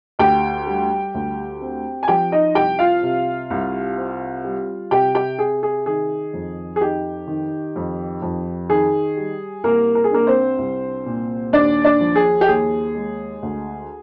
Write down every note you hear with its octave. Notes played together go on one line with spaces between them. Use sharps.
D2 G4 G5
G3
D2
C4
G#5
F3 G4 G5
D#4 D#5
C2 G4 G5
F4 F5
C3
C2
C4
G3
C3 G4 G5
G4 G5
C3 G#4
G#4
D#3 G#4
F2
G#4
D#4 G4
D#3
F2
F2
D#3 G#4
G3
C2 A#3 A#4
A#4
G#4
A#3 D4 A#4
C4 C5
C2
A#2
D#2 D4 D5
D4 D5
F3
G#4
G4
D#2 G#4
G#3
D2